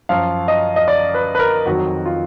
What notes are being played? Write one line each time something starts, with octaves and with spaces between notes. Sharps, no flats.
F#2 F3 F5
D#5
D#5
D5
B4
B4
A#4
F2 D#3 F#3 F#4
F4